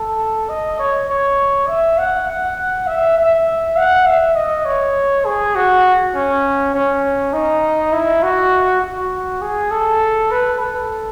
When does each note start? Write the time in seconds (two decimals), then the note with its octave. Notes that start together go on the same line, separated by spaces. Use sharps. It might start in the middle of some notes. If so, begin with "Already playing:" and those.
Already playing: A4
0.49 D#5
0.79 C#5
1.09 C#5
1.68 E5
1.98 F#5
2.28 F#5
2.87 E5
3.18 E5
3.77 F#5
4.06 E5
4.36 D#5
4.65 C#5
5.25 G#4
5.55 F#4
6.15 C#4
6.74 C#4
7.33 D#4
7.93 E4
8.23 F#4
8.82 F#4
9.41 G#4
9.71 A4
10.31 B4
10.60 A4